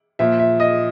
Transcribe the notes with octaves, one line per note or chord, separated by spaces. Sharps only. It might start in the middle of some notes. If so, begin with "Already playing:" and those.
A#2 F3 E5
E5
D#5